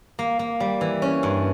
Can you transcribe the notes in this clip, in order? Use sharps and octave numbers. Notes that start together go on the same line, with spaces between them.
A#3
A#3
G3
E3
C#4
G2